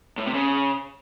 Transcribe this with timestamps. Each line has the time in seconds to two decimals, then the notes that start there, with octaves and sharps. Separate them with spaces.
0.17 A2
0.26 C3
0.34 C#3